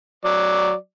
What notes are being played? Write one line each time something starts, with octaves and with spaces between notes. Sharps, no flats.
F#3 D5